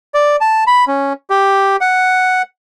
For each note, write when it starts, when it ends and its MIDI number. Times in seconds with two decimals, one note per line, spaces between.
0.14 0.36 74
0.41 0.64 81
0.67 0.85 83
0.87 1.13 61
1.30 1.76 67
1.81 2.42 78